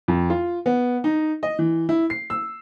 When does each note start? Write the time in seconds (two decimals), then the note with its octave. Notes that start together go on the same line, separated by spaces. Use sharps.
0.08 F2
0.30 F4
0.66 B3
1.04 D#4
1.43 D#5
1.59 E3
1.89 E4
2.10 C7
2.30 E6